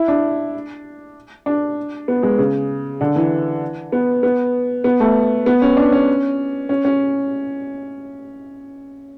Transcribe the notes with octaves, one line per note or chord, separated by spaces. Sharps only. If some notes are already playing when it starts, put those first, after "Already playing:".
Already playing: E4
D4
D4
B3
G#3
C#3
D3
E3
B3
B3
B3
A3
B3
C#4
D4
C#4
C#4
C#4